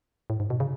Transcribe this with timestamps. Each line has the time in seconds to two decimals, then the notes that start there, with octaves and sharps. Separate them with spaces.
0.30 A2
0.40 G#2
0.50 B2
0.60 C#3